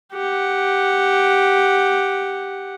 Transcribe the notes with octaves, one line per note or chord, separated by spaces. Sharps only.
G4 F#5